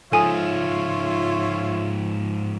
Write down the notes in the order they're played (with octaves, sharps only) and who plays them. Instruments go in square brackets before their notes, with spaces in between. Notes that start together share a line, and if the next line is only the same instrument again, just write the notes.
[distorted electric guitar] G#2 F3 [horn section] F4 C#5 E5 [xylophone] A4 G#5 D#6